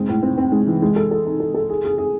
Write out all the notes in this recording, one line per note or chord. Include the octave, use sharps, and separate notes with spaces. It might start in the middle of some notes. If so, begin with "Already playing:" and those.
Already playing: G#3 C4
A2
C4
C4
G#3
E3
G#3
A4
A4
D#4
A4
A4
G#4
G#4
G#4